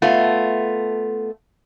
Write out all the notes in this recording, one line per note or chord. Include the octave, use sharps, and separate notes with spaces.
A3 B3 F4